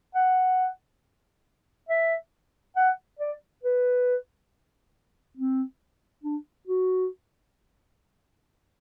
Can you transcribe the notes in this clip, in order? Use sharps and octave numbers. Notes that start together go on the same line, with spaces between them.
F#5
E5
F#5
D5
B4
C4
D4
F#4